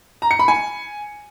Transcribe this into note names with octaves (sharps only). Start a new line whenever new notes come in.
A#5
C#7
B5
G#5